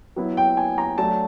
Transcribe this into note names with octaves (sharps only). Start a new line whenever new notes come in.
F#3 B3 E4
G5
G#5
A#5
F#3 A3 D4 A5